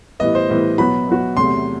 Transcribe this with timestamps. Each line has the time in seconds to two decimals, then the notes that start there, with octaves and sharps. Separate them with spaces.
0.20 A2 E3 G3 B3 D#5
0.35 C5
0.50 A2 E3 G3 B3
0.78 B2 F#3 B3 F#4 B5
1.07 B2 F#3 B3 F#4
1.36 E2 C3 F#3 A3 C6